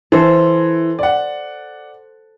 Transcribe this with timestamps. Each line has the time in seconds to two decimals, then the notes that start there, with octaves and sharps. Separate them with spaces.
0.12 E3 A4 C5
0.99 D5 F#5